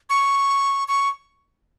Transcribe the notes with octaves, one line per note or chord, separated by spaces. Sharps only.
C#6
C#6